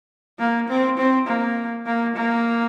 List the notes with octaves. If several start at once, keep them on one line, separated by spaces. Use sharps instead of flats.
A#3
C4
C4
A#3
A#3
A#3